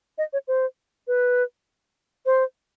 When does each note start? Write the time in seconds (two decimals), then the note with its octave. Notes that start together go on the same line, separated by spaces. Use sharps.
0.18 D#5
0.33 C#5
0.48 C5
1.07 B4
2.26 C5